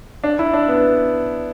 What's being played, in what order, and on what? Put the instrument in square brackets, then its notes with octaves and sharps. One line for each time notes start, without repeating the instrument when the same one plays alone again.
[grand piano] D4
E4
D4
B3